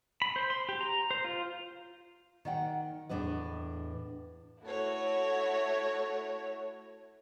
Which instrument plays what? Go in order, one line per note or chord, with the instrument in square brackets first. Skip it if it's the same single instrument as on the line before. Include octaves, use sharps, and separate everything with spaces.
[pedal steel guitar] B5
C5
C6
G4
A#5
C5
F4
[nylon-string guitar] D#3 D5 F#5 G5
E2 A2 D4 A4 B4 D#5
[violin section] A3 E4 F#4 A4 C#5